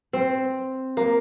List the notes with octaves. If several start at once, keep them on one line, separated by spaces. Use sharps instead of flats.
C4
A#3